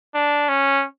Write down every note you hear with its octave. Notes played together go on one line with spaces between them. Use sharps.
D4
C#4